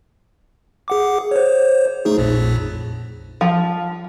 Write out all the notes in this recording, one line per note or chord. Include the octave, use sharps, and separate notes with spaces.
G#4 F#5 D6
C5 C#5
A3 D#4 G#4
A#1 F2 A#2
F3